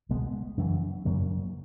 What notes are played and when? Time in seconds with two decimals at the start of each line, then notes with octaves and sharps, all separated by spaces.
0.09 C#2 B2 G#3 B3
0.57 F#2 C#3 E3
1.05 F#2 C#3 F#3 A#3